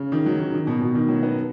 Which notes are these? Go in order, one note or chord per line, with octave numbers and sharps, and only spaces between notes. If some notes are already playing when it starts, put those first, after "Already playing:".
Already playing: C#3
D#3
F#3
D#3
D#3
B2
B2
D#3
F#3
B3